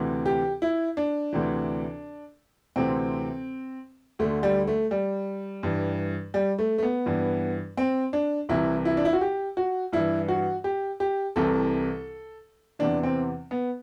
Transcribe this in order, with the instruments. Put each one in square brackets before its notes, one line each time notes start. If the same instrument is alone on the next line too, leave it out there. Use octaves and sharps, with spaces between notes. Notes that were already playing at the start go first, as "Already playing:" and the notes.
Already playing: [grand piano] D2 C3 E3
G4
E4
D4
D2 C3 E3
D2 C3 E3 C4
D2 D3 A3
G3
A3
G3
G2 E3
G3
A3
A3
B3
G2 E3
C4
D4
C2 C3 E3 E4
E4
D4
E4
F#4
G4
F#4
G2 E3 E4
F#4
G4
G4
C2 C3 E3 A4
E2 C3 E3 D4
C4
B3